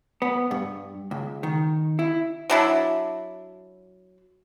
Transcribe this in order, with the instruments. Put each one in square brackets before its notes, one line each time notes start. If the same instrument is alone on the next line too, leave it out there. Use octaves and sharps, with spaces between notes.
[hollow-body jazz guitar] B3
G2
C#2
D#3
E4
[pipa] F#3 D4 E4